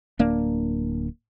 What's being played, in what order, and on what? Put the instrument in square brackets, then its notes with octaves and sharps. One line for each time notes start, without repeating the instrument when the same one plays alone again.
[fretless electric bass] D1 A#3 D4